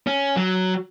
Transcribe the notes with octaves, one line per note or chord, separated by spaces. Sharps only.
C#4
F#3